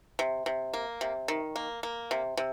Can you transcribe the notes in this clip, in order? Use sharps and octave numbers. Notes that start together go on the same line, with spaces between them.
C3
C3
A#3
C3
D#3
A#3
A#3
C3
C3